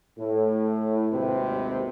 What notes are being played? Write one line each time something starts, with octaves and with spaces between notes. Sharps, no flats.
A2
G#1 D#2 C3 C4 B4